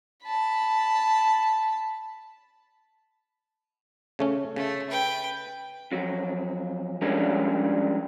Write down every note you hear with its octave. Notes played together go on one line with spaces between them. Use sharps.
A5 B5
C#3 A3 C#4
C#3 A3
B4 G5
F2 F#3
F3 G3 G#3 C#4 D4 A#4